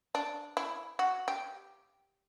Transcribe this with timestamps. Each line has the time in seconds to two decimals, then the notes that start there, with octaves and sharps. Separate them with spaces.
0.15 D4
0.57 E4
0.99 F#4
1.28 G4